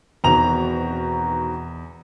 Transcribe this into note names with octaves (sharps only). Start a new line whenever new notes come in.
E2 B2 D#3 C4 A#5 F7